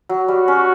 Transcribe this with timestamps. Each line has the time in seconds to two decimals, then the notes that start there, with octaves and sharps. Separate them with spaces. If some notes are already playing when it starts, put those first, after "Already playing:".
0.09 F#3
0.28 G3 F#4
0.48 C#4